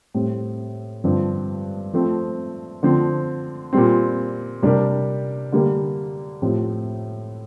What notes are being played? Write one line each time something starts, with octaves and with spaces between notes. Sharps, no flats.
A2 G3 C4
G2 D3 F3 C4
F3 A3 C4
D3 F3 C4
A#2 G3 C4
C3 G3 D4 G4 A#4
D3 G3 A#3
A2 F3 C4 G4